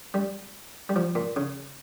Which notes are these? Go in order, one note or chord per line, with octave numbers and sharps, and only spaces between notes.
G3
G3
F3
A#2
C#3